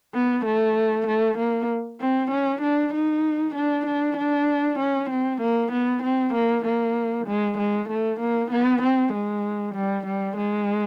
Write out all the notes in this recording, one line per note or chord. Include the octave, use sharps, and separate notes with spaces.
B3
A3
A3
A#3
C4
C#4
D4
D#4
D4
D4
D4
C#4
C4
A#3
B3
C4
A#3
A#3
G#3
G#3
A3
A#3
B3
C4
G#3
G3
G3
G#3